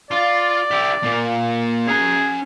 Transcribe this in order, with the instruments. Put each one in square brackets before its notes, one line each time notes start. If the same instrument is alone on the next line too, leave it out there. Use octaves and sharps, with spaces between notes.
[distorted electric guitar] F4 [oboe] D5
[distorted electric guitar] E4 G4
A#2 A#3
[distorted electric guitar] C#4 A#5 [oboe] G#4